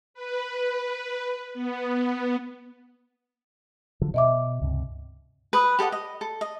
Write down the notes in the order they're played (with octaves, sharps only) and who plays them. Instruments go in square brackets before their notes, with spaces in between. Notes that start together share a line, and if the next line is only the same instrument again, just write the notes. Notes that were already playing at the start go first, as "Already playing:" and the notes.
[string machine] B4
B3
[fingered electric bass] D3 F3 F#3
[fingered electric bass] B2 [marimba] D#5 E5 D6
[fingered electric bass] C#2 G2 C3
[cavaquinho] B4 D#6
G4 A4 D#5 F#5
D#5
A4
D#5